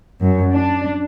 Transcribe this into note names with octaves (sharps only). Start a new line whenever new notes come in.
F#2
D4